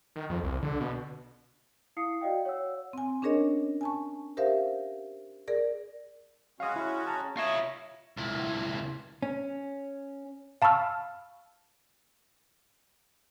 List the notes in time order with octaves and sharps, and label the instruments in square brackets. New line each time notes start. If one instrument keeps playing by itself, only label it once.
[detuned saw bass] D#3
F2
C2
D3
B2
[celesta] E4 F5 D#6 C7 C#7
F#4 D5 D#5 F5 G5
C#5 F#5 E6
[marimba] C4 G#5
C#4 D4 G#4 A#4 C#5 D#5
G#5 A5 C#6
G4 A#4 C5 E5 F5
G#4 A#4 D5
[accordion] G#3 C#4 F#4 [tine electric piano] F5 D#6
[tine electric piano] E4
A5 A#5
[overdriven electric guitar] F4 E5 [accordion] C#5 D#5 C#6
[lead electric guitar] C#2 E4
[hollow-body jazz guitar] C#4
[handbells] F5 A5 B5 C#6 E6 F6